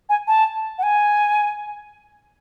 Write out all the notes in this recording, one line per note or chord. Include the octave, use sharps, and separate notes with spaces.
G#5
A5
F#5
G#5